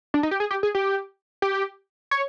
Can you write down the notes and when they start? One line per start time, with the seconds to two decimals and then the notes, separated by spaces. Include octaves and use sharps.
0.14 D4
0.23 D#4
0.31 G4
0.40 G#4
0.51 G4
0.63 G#4
0.75 G4
1.42 G4
2.11 C#5